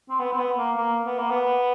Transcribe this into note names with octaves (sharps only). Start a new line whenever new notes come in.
C4
B3
C4
B3
A#3
A#3
B3
A#3
B3